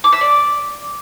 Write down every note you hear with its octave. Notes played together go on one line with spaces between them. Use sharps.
D6
E5
D5